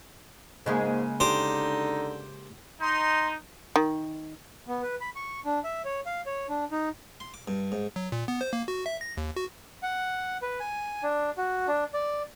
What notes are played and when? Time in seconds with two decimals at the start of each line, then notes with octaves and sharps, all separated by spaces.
0.66 G#2 C#3 G#3 A#3
1.20 D3 D#4 G4 C5
2.81 D#4 C6
3.76 D#3
4.68 B3
4.82 B4
5.01 B5
5.16 C#6
5.45 D4
5.64 E5
5.85 C#5
6.06 F5
6.26 C#5
6.49 D4
6.72 D#4
7.20 C6
7.34 D6
7.48 G2
7.72 G#2
7.96 F#3
8.12 A#2
8.28 B3
8.41 C5
8.53 A#3
8.68 F#4
8.86 E5
9.01 A#6
9.17 D#2
9.36 F#4
9.83 F#5
10.42 B4
10.60 G#5
11.03 D4
11.37 F#4
11.68 D4
11.93 D5